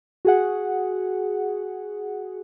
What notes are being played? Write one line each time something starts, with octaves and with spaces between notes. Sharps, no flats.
F#4 G#4 F#5